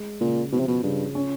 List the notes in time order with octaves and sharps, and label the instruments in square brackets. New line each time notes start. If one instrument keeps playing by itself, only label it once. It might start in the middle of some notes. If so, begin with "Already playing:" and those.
Already playing: [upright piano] G#3
[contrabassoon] A#2 [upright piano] C#3
[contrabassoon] B2 [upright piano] F3
[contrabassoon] C3
B2
[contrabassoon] G2 [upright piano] C#3
[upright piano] C#4